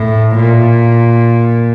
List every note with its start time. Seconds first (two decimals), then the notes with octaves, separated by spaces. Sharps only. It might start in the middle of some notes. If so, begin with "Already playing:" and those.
Already playing: A2
0.35 A#2